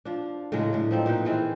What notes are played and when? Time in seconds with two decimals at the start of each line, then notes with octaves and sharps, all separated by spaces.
0.05 F3 D4
0.52 A2 C#3 F#3 G#3
0.73 A2 D4
0.91 F3 C4 D#4
1.06 A#2 D#4 B4 G5
1.25 D#3 E3 C4 G#4